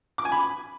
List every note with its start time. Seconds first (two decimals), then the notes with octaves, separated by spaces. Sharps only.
0.18 D6
0.25 G#5
0.32 B5